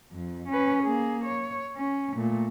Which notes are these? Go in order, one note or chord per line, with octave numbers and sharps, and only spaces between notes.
F2
C#4 B4
A#3 G#4
C#5
C#4
A#2 A3